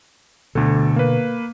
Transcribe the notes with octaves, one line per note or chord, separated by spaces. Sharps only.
D2 B2 D3 A4
A#3 B4